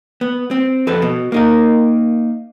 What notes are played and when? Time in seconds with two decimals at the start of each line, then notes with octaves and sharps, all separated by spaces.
0.21 B3
0.51 C4
0.87 F2 A4 B4
1.02 B2
1.32 A#3 D#4 A#4